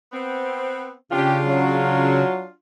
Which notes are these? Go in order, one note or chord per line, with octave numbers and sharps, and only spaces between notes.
B3 C4
C#3 C#4 D4 F4 G4
F#3